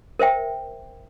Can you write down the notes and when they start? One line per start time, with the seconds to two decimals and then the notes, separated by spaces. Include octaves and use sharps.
0.19 A#4 C5 E5 G5